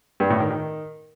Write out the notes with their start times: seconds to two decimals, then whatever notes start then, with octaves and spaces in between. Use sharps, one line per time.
0.20 G2
0.30 A2
0.40 D#3
0.50 D#3